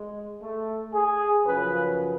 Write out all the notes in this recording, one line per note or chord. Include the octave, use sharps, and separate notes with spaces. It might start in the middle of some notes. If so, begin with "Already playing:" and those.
Already playing: G#3
A3
G#4
F#2 C#3 F3 B4